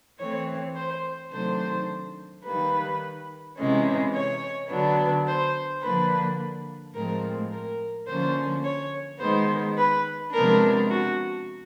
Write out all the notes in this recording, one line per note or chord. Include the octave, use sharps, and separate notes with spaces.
E3 A3 C4 C#5
C5
C3 D#3 F#3 A3 D4 C5
D#3 G3 A#3 B4
C3 E3 G#3 C#4
C#5
D3 F#3 B3 D4
C5
D3 F3 A#3 D4 B4
A2 F3 G#3 C4 A#4
A#4
D3 F3 A#3 C#4 C5
C#5
D#3 G#3 B3 C5
B4
C3 F3 G#3 B3 D4 A#4
F#4